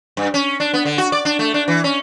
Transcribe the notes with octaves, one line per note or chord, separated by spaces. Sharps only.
G2
C#4
D4
B3
D3
F#4
D5
D4
A3
D4
E3
C#4